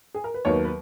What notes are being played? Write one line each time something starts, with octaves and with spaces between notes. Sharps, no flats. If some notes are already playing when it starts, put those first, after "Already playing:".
G#4
A#4
B4
D#2 D#3 F#3 B3 C#5
B4